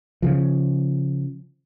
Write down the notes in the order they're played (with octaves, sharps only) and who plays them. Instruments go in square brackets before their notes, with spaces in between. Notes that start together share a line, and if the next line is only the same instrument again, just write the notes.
[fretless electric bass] C#3 F3